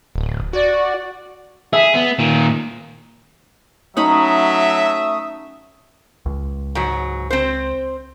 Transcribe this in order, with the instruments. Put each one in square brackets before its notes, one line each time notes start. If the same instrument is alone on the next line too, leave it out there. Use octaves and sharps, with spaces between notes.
[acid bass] D1
[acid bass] F#4 [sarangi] D5
[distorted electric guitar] G#4 [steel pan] E5
[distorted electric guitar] B3
A#2 D#3
[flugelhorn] F#3 [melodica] A3 D#6 [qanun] C#4 D#4 B5 [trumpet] E5
[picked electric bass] C#2
[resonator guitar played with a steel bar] G#2 F#3
C4 C5